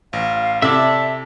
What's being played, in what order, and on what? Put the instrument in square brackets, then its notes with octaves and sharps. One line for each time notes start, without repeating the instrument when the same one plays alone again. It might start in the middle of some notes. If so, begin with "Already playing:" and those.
[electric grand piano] A1 [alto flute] F5
[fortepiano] C3 [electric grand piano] E4 A4 [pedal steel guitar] D5 E5 [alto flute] A5